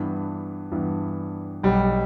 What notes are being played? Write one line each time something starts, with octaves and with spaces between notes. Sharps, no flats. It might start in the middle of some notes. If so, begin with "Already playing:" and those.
Already playing: G2 E3 B3 D4
G2 E3 B3 D4
B1 B2 G3